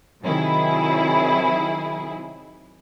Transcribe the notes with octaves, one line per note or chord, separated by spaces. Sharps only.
C3 D#3 F#3 E4 G#4